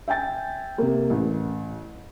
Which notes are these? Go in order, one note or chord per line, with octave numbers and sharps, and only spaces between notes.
E5 G5 G#5 A6
C3 A#3
A1